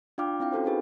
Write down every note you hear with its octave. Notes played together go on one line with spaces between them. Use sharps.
D4 F4 F5 G5 D6 F6
C4 E4 F5 G5
C#4 F#4 A4 C5
C4 D#4 F#4 G#4 B4